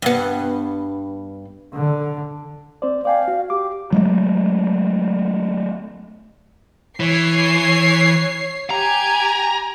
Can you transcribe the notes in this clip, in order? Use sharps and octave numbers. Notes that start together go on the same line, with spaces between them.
G2 B3
D3
C4 C5 D5
D5 F5 G5 G#5
F#4
G4 D6
F#3 G#3 A3
E3 C#5 C7
G4 G#5 A#5